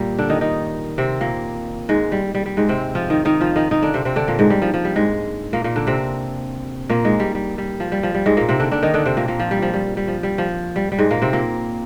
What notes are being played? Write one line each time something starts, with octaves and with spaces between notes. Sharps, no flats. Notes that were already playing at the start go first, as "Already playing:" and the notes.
Already playing: A#2 G3 A#3
D3 D4
D#3 D#4
D#3 D#4
C3 C4
A#2 A#3
G#2 G#3
G3
G3
G3
G#2 G#3
C3 C4
F3 F4
D#3 D#4
D#3 D#4
F3 F4
D#3 D#4
D#3 D#4
D3 D4
C3 C4
C3 C4
D3 D4
A#2 A#3
G#2 G#3
G3
F3
F3
G3
G#2 G#3
A#2 A#3
A#2 A#3
D3 D4
C3 C4
A#2 A#3
G#2 G#3
G3
G3
G3
F3
G3
F3
G3
G#2 G#3
A#2 A#3
C3 C4
D3 D4
D3 D4
D#3 D#4
D3 D4
C3 C4
A#2 A#3
A#2 A#3
F3
G3
F3
G3
G3
F3
G3
F3
G3
G3
G#2 G#3
A#2 A#3
C3 C4
A#2 A#3